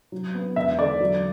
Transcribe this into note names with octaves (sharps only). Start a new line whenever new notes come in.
F#3
B3
E1 E5
D3 D5
F#3